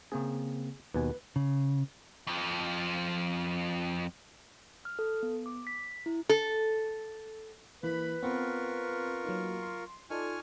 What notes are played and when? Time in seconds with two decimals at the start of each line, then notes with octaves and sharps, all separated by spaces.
0.12 C#3 A#3 C4 G#4
0.94 D#2 B2 B4 G#5
1.36 C#3
2.27 F2 F3
4.85 F6
4.99 A4
5.23 B3
5.46 D6
5.67 B6
6.06 E4
6.29 A4
7.83 E3 A#3 B4 B5
8.23 B3 C4 F4 A#4 C#6
9.25 F#3 A#3 D#4
9.63 C6
10.10 D#4 F4 A4 D5 G#5 C#6 F6